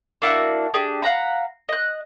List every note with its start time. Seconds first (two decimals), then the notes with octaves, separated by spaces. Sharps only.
0.22 A#3 D4 E4 F#4
0.74 D4 G4 G#4
1.02 F5 F#5 A#5 B5
1.69 D#5 F#6